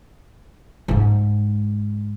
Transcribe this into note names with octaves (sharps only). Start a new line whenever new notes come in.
G#2 G#3